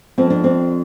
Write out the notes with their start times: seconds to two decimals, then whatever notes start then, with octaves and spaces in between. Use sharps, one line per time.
0.18 F2 C4
0.30 D4
0.44 C4 D4